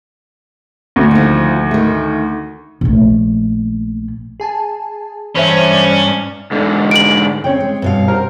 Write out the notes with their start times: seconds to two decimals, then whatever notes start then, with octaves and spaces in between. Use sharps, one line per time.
0.96 D2
1.11 D#2 F3
1.71 D#3 A3
2.81 A#1 A3
4.40 G#4 G#5 A5
5.36 G2 E3 C#4 C5 E5
6.51 G#2 D3
6.91 D7 F#7
7.44 C#3 C4 C#5 G5
7.60 G#3
7.82 G2 B2 F5
8.08 A#4 C5